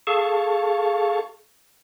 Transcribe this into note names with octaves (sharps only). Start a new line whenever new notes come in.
G#4 A4 F5 A5 C#6